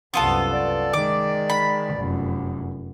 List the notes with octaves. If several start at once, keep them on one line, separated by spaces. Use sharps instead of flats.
C2 F#2 B3 F4 A4
D5
D#3 G#3 D6
B5
F1 F#2